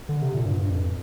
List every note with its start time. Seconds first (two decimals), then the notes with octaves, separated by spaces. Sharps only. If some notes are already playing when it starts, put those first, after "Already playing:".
0.09 D3
0.22 C3
0.34 A#2
0.46 G2
0.59 G2
0.70 F2